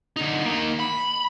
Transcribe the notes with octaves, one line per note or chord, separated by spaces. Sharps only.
D3 D#4
A#3 D#4
B5